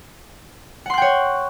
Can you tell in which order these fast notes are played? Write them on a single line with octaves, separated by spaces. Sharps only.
F#5 C6 F#6 G5 C#5